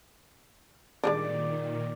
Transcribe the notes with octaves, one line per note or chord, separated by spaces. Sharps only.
A#2 D#3 G3 G#3 D4 D5 D6